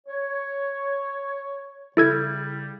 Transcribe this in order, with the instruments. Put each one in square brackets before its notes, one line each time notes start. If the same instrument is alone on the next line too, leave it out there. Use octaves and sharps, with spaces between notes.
[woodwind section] C#5
[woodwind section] C#3 G3 [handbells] E4 A4 G#6